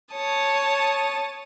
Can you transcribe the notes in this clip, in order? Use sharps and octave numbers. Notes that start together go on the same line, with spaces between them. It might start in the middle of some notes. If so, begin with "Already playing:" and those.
C#5 A5 D#6